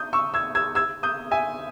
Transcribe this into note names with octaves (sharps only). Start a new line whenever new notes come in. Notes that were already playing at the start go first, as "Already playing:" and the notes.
Already playing: D#6 G6
C#6 E6
E6 G#6
E6 G#6
E6 G#6
D#6 G6
E5 G#5